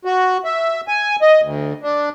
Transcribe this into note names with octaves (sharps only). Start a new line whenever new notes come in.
F#4
E5
G#5
D#5
D2
D4